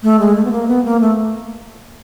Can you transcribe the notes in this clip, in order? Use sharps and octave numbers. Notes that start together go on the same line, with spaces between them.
A3
G#3
A3
B3
A#3
B3
A#3
A3